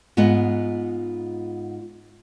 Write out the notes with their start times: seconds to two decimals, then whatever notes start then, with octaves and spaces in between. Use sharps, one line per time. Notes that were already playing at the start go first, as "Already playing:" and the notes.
0.17 G#2 B3 F4 D#5 F#5